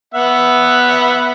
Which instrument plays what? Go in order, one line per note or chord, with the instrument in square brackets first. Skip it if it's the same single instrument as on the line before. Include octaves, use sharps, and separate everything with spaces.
[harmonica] B3 E5 F#5